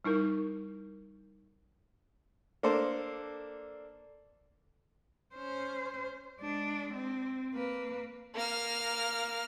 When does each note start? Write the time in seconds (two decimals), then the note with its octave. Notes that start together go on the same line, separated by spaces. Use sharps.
0.04 G3 D#4 E4 A#4
2.63 A#3 D4 A4 C5
5.35 C#4 C5
6.39 G#3 D4
6.94 C4
7.54 A#3 B4
8.35 A#3 F6